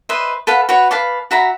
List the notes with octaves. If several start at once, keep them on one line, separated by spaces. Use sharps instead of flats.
B4 C5 D#5 E5
A4 B4 F5 F#5
F#4 B4 C#5
B4 F5 A5 D6
F#4 E5 A#5 B5